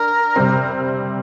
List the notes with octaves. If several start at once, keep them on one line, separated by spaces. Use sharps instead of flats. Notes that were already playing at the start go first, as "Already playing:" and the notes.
Already playing: D4 A#4
C3 G3 C4